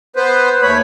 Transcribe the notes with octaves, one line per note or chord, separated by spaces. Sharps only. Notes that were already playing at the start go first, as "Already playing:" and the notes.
B3 B4 C5
D#2 A3 C#5 B5